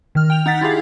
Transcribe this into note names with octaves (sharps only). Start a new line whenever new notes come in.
D#3 F6
G5 F7
D#4 F#5 A6 B6
E4 F4 G4 G#4 F5